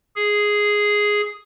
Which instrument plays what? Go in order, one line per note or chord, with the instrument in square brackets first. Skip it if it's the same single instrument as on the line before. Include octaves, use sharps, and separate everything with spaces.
[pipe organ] G#4